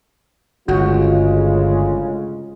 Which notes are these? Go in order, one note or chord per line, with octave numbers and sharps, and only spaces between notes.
G1 D2 C#3 G#3 F4 F#4